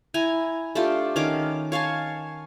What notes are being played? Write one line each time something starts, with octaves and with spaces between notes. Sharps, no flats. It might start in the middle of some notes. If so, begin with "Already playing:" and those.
E4 G#5 A#5
A3 D4 F4 G4
D#3 C#4 F5 D6
C#5 F5 G#5 A5